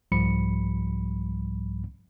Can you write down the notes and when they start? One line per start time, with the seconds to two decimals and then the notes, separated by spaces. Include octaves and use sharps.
0.12 C2 G#2 F3 G3 B5 C#7